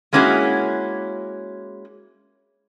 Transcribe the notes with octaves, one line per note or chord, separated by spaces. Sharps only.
G#3 A#3 C#4 E4 F#4 G#4